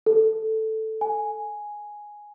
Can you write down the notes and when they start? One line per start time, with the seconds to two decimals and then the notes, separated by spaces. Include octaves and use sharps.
0.06 A4
1.01 G#5